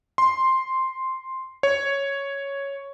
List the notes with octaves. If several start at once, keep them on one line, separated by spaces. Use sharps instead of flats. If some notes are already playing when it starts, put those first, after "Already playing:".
C6
C#5